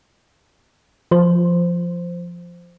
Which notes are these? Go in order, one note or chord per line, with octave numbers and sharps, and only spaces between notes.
F3 C5